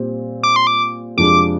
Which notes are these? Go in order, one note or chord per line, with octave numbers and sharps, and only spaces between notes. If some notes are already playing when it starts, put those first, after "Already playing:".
Already playing: A#2 G3 C4 G4
D6
C6
D6
F2 C3 F3 G#3 D4 D6